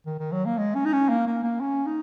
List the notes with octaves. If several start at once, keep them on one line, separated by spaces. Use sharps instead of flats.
D#3
D#3
F#3
A#3
G#3
C#4
D#4
C#4
A#3
A#3
A#3
C#4
D#4